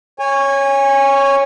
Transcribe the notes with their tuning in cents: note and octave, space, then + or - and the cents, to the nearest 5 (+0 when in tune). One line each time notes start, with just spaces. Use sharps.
C#5 +0 G#5 -25